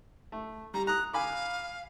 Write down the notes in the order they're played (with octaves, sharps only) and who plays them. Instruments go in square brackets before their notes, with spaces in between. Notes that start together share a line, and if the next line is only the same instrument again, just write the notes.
[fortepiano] A3
[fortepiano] G3 [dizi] A#5
[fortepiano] A#5 D#6 [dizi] F#6
[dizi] F5 [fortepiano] G#5 B5 D6